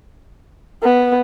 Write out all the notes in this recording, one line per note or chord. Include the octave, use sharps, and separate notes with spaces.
B3